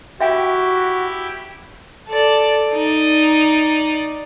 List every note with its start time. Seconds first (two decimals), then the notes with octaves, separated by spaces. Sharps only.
0.20 E4 F#4 G4 E5 F5 G5
2.08 A4 D5
2.73 D#4 D5